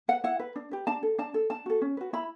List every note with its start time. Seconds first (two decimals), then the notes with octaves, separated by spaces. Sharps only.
0.08 B4 F#5
0.24 E4 F#5
0.39 B4
0.56 D4
0.71 G4 B4
0.87 D4 A5
1.03 A4
1.18 D4 A5
1.34 A4
1.50 D4 A5
1.66 F#4 A4
1.82 C#4
1.97 F#4 B4
2.13 E4 B5